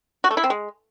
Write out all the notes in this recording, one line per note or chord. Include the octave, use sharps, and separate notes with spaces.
F#4
A3
E4
C4
G#3